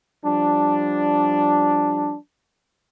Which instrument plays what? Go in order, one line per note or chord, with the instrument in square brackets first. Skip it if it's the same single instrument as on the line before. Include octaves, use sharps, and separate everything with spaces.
[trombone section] F3 G3 D4